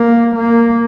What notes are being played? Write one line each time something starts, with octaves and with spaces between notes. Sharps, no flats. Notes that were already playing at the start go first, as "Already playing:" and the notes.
Already playing: A#3
A#3